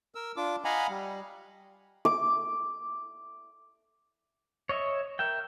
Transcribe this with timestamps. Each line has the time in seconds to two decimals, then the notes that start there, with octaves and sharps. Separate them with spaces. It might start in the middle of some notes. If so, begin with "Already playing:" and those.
0.15 A#4 E6
0.36 D4 F4 D6
0.65 D#5 F5 F#5 G#5 A#5 B5
0.90 G3
2.05 D6
4.69 C#5 D#5 E5
5.19 A#4 E5 G5